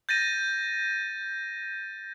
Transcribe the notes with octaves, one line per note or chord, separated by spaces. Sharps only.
G6 A6 A#6 D#7